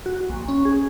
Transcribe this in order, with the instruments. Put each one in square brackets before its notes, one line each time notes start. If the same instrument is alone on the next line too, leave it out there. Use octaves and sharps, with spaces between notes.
[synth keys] F#4
A#1
C#4
G#4